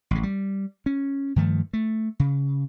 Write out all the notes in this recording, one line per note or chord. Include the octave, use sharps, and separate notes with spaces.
A1 C#3
G3
C#4
G2 D#3 F3 A3
A3
C#3